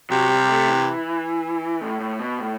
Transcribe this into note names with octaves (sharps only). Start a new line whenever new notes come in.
C3 F#3
G3
A3
E3
A2
A2
B2
A2